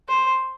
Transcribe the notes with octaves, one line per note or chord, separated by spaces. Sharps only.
C5